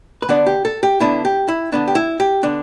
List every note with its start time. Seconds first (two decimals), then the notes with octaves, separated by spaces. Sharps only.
0.22 B4
0.29 D3 B3 D4 D5
0.46 G4
0.65 A4
0.83 G4
1.00 D3 B3 D4 E4
1.25 G4
1.48 E4
1.72 D3 B3 D4
1.88 G4
1.95 E4
2.20 G4
2.43 D3 B3 D4